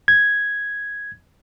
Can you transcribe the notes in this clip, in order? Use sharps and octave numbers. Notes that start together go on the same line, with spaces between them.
G#6